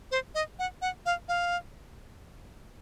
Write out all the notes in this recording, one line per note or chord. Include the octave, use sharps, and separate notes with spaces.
C5
D#5
F#5
F#5
F5
F5